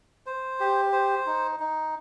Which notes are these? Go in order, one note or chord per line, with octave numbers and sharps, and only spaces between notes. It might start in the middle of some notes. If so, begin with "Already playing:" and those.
C5
G4
C5
D#4
D#4